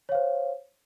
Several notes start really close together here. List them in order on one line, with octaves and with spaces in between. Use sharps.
C#5 F5 C5